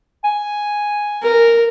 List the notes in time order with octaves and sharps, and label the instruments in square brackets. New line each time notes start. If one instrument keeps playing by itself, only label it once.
[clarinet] G#5
[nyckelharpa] A#4